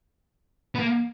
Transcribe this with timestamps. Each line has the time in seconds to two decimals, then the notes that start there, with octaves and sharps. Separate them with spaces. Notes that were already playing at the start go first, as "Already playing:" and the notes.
0.75 B3
0.79 A#3